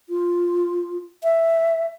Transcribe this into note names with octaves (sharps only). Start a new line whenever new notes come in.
F4
E5